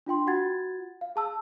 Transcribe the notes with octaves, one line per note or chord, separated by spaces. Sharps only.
D4 F4 G5 C6
F4 F#4 F#5 G#6 A6
F5
G#4 A5 E6